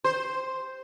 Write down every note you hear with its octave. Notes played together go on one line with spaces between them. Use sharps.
C5